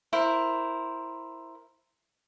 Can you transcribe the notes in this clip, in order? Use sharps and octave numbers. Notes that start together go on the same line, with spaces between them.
E4 A#4 C5